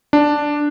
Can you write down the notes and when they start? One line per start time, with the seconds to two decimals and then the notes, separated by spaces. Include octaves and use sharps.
0.13 D4